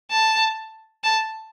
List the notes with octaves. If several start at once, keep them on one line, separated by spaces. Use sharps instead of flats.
A5
A5